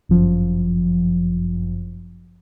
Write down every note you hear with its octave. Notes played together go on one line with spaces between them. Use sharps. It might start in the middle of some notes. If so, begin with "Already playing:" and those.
G1 F#2 F3